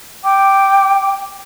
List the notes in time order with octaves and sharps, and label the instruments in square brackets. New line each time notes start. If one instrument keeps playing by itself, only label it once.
[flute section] G5 D6